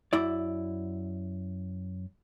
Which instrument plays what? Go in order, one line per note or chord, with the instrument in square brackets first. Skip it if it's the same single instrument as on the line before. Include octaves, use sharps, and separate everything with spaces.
[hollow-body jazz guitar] F#2 E4 D5